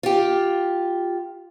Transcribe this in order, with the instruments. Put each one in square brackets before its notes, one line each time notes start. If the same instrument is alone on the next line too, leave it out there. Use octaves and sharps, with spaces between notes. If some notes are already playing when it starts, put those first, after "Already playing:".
[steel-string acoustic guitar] F4 G4